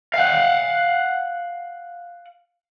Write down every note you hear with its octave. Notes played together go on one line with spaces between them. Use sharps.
F5 F#5